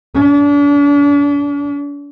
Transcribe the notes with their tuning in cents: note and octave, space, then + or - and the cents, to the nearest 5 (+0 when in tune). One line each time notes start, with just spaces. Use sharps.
D4 -40